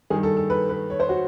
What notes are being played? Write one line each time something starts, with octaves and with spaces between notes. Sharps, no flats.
G2 D#3 G#4
A4
A4
B4
B4
C#5
C5
F#4